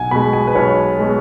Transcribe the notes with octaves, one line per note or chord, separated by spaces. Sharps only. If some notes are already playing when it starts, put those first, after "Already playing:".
Already playing: B1 F#5 G#5
B2 G#3 B5
G#5
B4
B1 C#5
B2 G#3